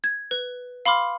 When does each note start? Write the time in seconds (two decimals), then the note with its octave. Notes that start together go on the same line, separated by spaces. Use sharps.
0.04 G#6
0.31 B4
0.86 F5 B5 C6 D6 F6